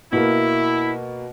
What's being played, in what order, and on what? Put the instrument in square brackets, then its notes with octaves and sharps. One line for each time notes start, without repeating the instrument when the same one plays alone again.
[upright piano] B2 A#3 [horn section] E4